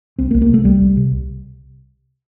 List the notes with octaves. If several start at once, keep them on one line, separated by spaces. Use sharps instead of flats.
C2 C4
A#3
C2
A#3
C3 A3
C2 G3
C2
C3